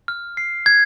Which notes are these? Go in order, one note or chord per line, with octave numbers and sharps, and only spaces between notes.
F6
C7
G#6